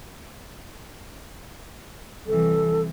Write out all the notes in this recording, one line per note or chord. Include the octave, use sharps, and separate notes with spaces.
C2 E3 A4